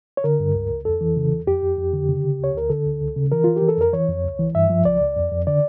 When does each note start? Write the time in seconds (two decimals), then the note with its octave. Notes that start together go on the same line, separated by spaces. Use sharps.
0.17 C#5
0.24 D3 A#4
0.40 G2
0.55 C#2
0.70 C#2
0.85 F2 A4
1.01 E3
1.16 C#3
1.32 E2
1.47 F2 G4
1.62 F2
1.78 F2
1.93 D3
2.09 C#3
2.24 C#3
2.39 D2 C#5
2.55 D2 A#4
2.70 D3 A4
2.86 D2
3.01 C#2
3.16 C#3
3.32 E3 A#4
3.44 E3 F4
3.56 G4
3.62 E3
3.69 A4
3.78 F2 A#4
3.93 E3 C#5
4.09 F2
4.24 C#2
4.39 E3
4.55 G2 E5
4.70 F3
4.85 C#2 D5
5.01 C#2
5.16 F2
5.32 F2
5.47 D3 D5